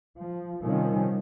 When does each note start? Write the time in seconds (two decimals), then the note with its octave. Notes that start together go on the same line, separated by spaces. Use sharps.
0.19 F3
0.63 C3 D#3 F3 G3 C#4